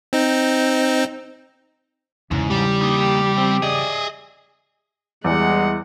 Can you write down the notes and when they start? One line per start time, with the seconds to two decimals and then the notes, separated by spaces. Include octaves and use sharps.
0.13 C4 D#4
2.31 E2 G#2 C#3
2.50 G3 G4
2.81 A#3 D#4
3.37 C4
3.62 G#4 D5 D#5
5.24 E2 G3 G#3 F#5